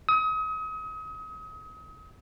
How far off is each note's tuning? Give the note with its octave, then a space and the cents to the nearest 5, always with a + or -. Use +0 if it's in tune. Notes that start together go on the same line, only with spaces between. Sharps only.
D#6 +35